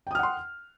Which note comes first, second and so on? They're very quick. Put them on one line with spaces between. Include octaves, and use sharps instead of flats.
G5 D#6 F6 F#5 C6